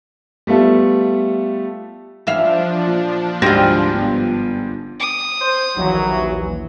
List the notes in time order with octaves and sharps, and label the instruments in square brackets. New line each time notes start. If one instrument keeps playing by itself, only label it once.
[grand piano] G3 A3 B3 F4 A4
[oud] E3 E5 F5 [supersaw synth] F3 D4
[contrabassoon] A#2
[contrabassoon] D2 [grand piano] G#2 G3 A#6 [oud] C4 F4
[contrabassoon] G1
[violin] D#6
[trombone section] C5
[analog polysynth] A#1 D#2 E3 [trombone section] F#3